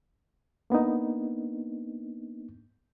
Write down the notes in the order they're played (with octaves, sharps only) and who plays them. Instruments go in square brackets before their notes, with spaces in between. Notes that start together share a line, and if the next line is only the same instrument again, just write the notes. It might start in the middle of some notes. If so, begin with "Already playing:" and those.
[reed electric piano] A#3 B3 D4 D#4